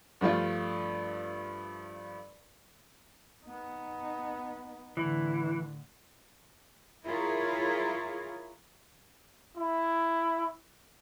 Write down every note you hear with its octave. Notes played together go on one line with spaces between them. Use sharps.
G2 F3 A3 F4
B3 D#4
A2 D3 E3
E4 F4 G#4 A#4 C#5
E4